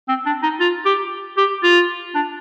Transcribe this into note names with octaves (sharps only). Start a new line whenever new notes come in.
C4
D4
D#4
F4
G4
G4
F4
D4